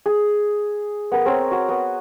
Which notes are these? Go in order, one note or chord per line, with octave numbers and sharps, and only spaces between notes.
G#4
B3 A#4
C4 A#4 C#5
F#4
B3